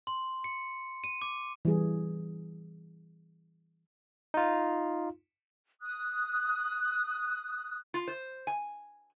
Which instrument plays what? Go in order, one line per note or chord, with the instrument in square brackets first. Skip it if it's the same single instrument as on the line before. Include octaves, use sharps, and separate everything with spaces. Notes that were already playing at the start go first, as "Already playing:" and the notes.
[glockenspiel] C6
C#7
D#7
D6
[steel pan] E3 G3 G#4
[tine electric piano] D#4 F4
[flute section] D#6 F#6
[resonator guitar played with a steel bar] F4
C5
G#5